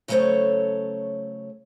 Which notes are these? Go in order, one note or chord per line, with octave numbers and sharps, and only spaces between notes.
C#3 F#3 A3 A4 C5 C#5